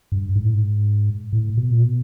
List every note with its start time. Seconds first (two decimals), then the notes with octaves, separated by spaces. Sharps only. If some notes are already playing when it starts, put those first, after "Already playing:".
0.12 G2
0.36 G#2
0.45 A2
0.54 G#2
1.33 A2
1.57 B2
1.70 A#2
1.82 B2